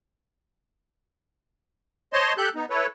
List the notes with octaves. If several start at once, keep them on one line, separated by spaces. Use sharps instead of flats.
C5 C#5 D#5 A5 C6
G4 A4 F#6 G6
B3 D#4
E4 A4 B4 C#5